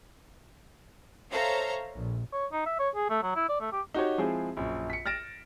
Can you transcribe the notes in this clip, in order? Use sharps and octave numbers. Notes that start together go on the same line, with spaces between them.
A4 C5 C#5 E5 F5 A#5
A#1
C#5
D#4
E5
C#5
G#4
A3
F#3
E4
D5
A3
G4
D#4 F#4 G4 C#5
F3 G#3 C4 E4 G#4
A#1 F#2
B6 C#7
F6 A6 A#6 D7 E7